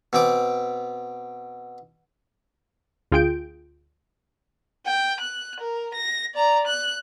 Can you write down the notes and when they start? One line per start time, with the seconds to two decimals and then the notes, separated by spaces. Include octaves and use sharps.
0.13 B2 C4 D6
3.12 D2 F4 G#4 G5 G6 D7
4.86 G5
5.20 F#6
5.60 A#4
5.94 A#6
6.34 D5 A#5
6.67 F#6